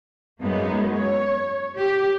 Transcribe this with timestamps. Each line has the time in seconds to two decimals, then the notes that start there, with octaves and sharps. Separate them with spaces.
0.40 F#2 G#3 A#3 B3 D#4
0.95 C#5
1.78 G4